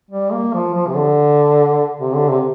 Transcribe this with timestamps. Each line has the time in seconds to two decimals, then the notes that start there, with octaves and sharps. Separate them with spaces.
0.11 G3
0.32 A#3
0.54 F3
0.74 F3
0.87 C3
0.95 D3
2.00 C3
2.14 D3
2.29 C3